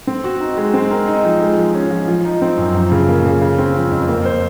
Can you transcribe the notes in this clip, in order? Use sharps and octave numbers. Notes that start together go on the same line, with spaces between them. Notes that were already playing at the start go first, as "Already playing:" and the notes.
C4
F#4
D#4
G#3
C4
A#4
D#4
F3
G#3
F3
C#4
F3
F3
D#4
C4
F#2
F3
C#3
A#3
C#3
C#3
C4
F3
F2
A#3
C5